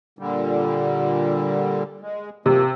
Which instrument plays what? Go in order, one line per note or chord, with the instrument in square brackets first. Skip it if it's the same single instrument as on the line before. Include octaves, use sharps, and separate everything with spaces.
[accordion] A#2 D3 G3
G#3
[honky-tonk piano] C3 [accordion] F3 A#3